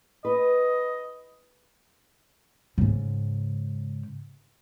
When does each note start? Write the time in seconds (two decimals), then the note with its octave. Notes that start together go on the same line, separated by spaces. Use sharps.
0.25 B4 D#5
2.78 G#2 C#3